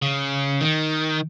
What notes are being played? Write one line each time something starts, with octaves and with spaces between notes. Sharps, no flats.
C#3
D#3